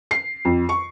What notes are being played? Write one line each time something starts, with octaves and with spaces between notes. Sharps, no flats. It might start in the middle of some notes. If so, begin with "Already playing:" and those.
C7
F2
C#6